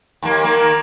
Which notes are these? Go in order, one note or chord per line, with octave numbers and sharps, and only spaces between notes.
D#2 A#3
D#3 A#3